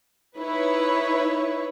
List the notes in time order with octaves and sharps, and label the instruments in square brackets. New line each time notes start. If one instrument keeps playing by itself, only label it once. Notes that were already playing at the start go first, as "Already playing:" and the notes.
[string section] D#4 E4 B4 C#5